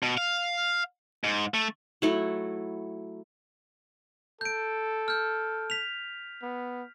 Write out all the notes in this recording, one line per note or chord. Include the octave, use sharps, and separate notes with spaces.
B2
F5
G#2
A3
F#3 A3 E4
A4 G6 D7
F6 G6
B6 F7
B3